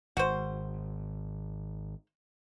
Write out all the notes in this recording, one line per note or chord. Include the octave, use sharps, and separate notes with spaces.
G#1 F#4 C5